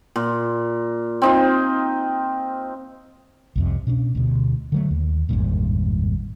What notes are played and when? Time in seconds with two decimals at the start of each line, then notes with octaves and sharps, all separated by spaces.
0.16 A#2
1.22 C4 D#4 F4
3.56 C2 F2 C3
3.87 B2 C#4 D4
4.15 D2 B2
4.72 D3 F#3 A3
4.90 D#2
5.29 G#1 E2 G2 A#2